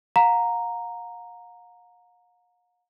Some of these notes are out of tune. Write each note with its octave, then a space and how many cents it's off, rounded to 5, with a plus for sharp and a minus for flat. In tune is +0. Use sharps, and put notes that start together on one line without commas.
F5 +45 A#5 +0